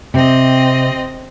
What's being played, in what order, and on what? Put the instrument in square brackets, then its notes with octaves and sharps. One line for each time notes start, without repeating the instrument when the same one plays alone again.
[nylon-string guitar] C3 [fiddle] C4 D#5